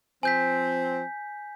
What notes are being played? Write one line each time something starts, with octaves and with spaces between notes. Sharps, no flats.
F3 C4 G#5 G6 B6